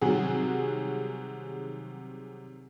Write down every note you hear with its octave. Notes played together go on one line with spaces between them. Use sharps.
C3 D#3 F#3 G3 F#4 G#4